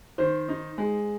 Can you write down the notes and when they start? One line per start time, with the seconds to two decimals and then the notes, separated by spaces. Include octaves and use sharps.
0.18 D#3 C5
0.48 D#4
0.78 G#3